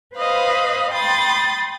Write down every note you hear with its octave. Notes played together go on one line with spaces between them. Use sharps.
B4 C5 D#5 F5 B5
G5 B5 C6 D#6 A6